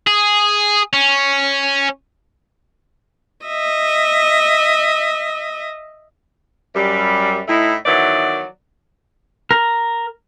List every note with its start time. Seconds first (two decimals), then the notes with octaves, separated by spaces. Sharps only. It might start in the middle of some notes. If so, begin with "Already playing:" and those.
0.07 G#4
0.93 C#4
3.46 D#5 E5
6.75 F#2 G3
7.48 A2 A3 D#4 E4
7.86 D#3 E3 F#3 B3 D5
9.51 A#4